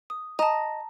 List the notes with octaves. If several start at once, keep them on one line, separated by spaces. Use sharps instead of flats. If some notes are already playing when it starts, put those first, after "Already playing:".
D#6
D#5 A5 A#5